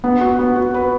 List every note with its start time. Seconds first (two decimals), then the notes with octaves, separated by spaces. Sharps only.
0.04 B3
0.21 F#4
0.39 B3
0.56 F#4
0.74 B4